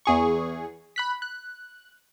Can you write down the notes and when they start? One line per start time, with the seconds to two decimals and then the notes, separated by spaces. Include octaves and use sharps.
0.06 E2 G#4 C#6
0.96 B5 F#6 B6
1.22 F#6